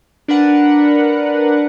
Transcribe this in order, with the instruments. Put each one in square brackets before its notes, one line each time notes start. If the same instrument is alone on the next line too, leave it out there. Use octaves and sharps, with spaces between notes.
[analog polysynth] D4 A#4 B4 F#5